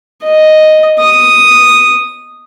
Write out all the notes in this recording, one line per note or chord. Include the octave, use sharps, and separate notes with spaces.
D#5
D#6